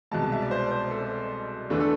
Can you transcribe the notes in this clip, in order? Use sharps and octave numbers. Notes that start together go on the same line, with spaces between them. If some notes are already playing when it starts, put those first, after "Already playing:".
C2 B2 G#3 A5
A5
E5
D5
C5
C5
A4
E2 D3 A3 D4 B4
A4